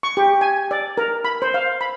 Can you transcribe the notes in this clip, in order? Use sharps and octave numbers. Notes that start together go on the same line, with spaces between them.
C#6
G4
G#5
D5
A#4
B5
C5
F5
B5